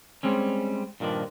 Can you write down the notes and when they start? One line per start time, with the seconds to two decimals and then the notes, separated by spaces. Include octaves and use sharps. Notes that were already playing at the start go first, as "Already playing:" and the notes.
0.23 G3 G#3 C4 C#4
1.00 G2 A#2 D#3 F3 D4